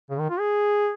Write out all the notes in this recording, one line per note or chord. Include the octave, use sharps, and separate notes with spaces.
C#3
D#3
F4
G#4